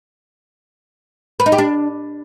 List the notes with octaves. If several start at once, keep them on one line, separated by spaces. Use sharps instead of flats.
B4
D#4
G4
D4